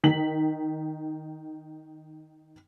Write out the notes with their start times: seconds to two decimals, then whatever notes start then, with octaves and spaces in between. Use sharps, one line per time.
0.04 D#3 B6 F#7